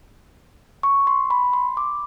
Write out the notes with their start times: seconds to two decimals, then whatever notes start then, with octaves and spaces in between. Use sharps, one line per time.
0.83 C#6
1.07 C6
1.30 B5
1.53 C6
1.77 D6